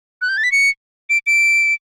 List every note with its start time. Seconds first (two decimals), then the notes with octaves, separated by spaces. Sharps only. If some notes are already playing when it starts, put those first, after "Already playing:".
0.22 F#6
0.29 G6
0.37 A6
0.44 B6
0.52 C#7
1.10 D7
1.27 D7